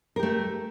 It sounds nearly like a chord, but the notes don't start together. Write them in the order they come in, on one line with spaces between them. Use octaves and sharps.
A#4 G4 A3